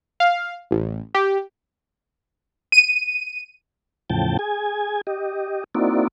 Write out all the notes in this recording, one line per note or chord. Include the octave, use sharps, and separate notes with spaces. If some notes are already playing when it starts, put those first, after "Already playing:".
F5
A1
G4
D#7
E2 A2 C#3 F3 G5 A5
G#4 G#5
G4 D#5
A#3 C4 D#4 E4 F#4 D5